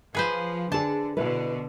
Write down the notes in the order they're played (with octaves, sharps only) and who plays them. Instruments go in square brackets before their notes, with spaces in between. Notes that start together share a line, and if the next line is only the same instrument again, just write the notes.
[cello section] F3 [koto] G#4 B4 C5
[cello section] D3 [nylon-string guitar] D4 G#4 [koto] A5
[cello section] B2 D3 [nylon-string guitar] E4 B4